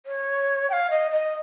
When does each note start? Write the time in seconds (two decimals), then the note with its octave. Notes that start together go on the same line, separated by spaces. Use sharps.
0.06 C#5
0.69 G5
0.73 F5
0.90 D#5
1.11 D#5